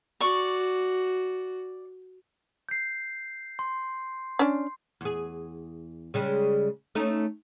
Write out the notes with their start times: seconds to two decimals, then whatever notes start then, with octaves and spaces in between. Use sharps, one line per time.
0.20 F#4 D5 C#6
2.69 G6 C7
3.59 C6
4.39 C#4 D4
5.01 E2 G#4
6.14 C#3 G3 G#3
6.95 A3 C#4 D#4